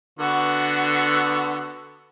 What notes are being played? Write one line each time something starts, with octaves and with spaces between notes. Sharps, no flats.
D3 B3 F#4